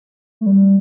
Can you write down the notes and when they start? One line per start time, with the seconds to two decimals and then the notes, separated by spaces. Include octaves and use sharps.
0.41 A3
0.46 G3